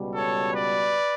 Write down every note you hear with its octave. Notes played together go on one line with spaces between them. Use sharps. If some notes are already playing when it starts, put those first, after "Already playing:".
Already playing: C#2 B2 G3
A4 C#5
B4 D5